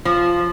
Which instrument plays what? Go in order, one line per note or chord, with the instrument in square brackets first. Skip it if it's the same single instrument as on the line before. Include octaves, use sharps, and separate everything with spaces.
[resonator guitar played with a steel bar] F3